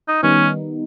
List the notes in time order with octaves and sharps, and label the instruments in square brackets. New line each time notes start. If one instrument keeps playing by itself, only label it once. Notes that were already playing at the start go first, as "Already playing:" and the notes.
[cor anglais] D#4
[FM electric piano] D#3 G3 B3 D#4 [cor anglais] C#4